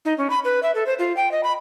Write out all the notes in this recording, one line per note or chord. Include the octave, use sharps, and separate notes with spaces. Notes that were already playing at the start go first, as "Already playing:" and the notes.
D#4
C#4
B5
B4
E5
A4
C5
F4
G5
D#5
B5